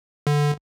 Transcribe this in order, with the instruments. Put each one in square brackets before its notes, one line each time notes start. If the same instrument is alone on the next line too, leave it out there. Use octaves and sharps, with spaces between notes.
[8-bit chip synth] D3